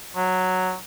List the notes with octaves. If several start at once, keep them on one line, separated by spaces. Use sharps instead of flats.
F#3